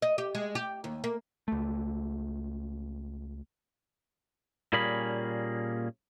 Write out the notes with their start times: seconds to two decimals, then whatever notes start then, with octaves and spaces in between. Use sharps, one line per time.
0.02 D#5
0.18 G4
0.35 G#3
0.55 G4
0.84 D#2
1.04 A#3
1.48 C#2 A3
4.73 A#2 G3 A#3 C#4 G#4 B5